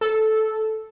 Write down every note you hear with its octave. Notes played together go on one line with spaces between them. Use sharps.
A4